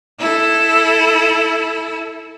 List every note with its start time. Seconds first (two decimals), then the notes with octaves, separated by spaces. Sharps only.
0.20 E4 A4